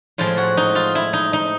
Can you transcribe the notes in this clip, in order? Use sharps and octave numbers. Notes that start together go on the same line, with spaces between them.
A2 F3 G#3 C4 F4
F#4
D#4
F4
E4
D#4
D#4